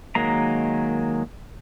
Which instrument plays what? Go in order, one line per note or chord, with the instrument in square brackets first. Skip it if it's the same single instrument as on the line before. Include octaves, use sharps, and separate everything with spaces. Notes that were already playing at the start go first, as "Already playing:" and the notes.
[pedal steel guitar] D#3 F#3 G#3 A#3 A#5